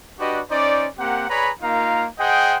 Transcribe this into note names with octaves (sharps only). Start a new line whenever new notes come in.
D4 F#4 G4 B4 D5 D#5
C#4 D#4 C5 D5
A#3 C4 G4 A#4 F#5
G#4 B4 C#5 D5 A#5 B5
A#3 D#4 F4 A#4 F5 A#5
G#4 C5 D#5 F#5 G5